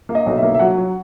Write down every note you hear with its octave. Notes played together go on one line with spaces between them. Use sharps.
A#3
D#5
B1
E5
A#3
E5
F#3 F#5
F#3